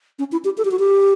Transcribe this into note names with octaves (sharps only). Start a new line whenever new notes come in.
C#4
E4
G4
A4
G4
F#4
G4